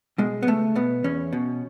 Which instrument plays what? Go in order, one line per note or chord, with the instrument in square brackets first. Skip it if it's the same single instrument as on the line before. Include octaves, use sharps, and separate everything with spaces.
[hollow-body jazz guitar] B2 G#3
B3
C#2 A3
B2 B3
E2 C#4
B2